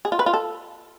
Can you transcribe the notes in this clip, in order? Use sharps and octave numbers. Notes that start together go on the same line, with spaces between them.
G#4
F4
B4
F4
A4